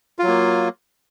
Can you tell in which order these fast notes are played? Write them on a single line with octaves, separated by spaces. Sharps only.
F4 F#3 A#3